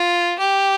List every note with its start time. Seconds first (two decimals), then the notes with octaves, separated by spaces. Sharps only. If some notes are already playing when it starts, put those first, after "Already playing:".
Already playing: F4
0.39 G4